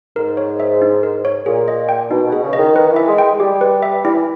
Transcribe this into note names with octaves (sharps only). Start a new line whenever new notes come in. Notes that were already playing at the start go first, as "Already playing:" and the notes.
G#2 A#4
C#5
E5
D#4
A#4
C#5
A#2 G#4
D#5
G5
B2 D#4
B2
G#4
C#3
D#5
D#3
D#3 B4
D#3
E3 E5
G#3
G5
G#3
G3 G4
B4
E5
G3 E4
E3